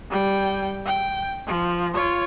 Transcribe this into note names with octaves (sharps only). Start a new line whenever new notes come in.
G3 G5
G5
F3
F4 C#5